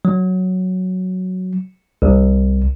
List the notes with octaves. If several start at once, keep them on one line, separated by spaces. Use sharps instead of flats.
F#3
C2